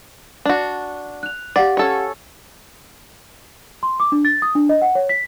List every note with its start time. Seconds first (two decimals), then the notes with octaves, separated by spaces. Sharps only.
0.45 D4 F#4
1.23 F#6 F7
1.56 G4 D5 F5 F#5
1.77 C#4 A4 C#5
3.83 C6
4.00 D6
4.12 D4
4.25 A6
4.42 D#6
4.55 D4
4.69 D#5
4.82 F#5
4.95 C#5
5.09 B6